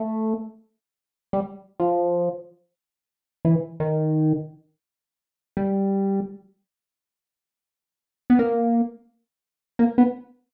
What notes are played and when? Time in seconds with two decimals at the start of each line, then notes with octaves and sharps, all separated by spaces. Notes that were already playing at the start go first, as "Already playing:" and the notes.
Already playing: A3
1.33 G3
1.80 F3
3.45 E3
3.80 D#3
5.57 G3
8.30 B3
8.39 A#3
9.79 A#3
9.98 B3